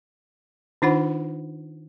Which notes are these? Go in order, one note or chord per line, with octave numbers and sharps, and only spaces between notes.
D#3 D4 D#4 F4 C5 F#5